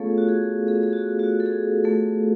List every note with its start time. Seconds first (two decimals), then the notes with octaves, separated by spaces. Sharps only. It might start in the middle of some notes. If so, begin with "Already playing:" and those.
Already playing: A3 B3 C#4 F4 G#4 A4 C#5 F5
0.18 F#4
0.29 G#4
0.68 G#4
0.83 G#4
0.93 F#4
1.19 F#4
1.40 A4
1.46 G#4
1.84 A3 A4